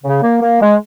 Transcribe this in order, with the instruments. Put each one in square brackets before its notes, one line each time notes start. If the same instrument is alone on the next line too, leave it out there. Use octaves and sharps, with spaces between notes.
[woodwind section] C#3
A#3
A#3
G#3